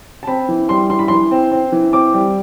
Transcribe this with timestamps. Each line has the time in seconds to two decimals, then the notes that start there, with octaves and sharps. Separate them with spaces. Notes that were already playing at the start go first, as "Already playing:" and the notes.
0.23 A5
0.27 C4 B5
0.49 E3
0.69 G3 C6
0.89 E3 C6
0.99 B5
1.08 E3 C6
1.31 C4
1.52 C4
1.72 E3
1.93 C4 D6
2.14 G3